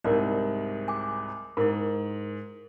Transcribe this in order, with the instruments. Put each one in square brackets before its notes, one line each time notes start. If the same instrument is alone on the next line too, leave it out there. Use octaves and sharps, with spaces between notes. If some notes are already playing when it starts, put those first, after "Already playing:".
[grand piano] C2 G#2 [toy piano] A#4 D5
[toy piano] G#5 D6
[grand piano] G#2 [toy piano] E4 A#4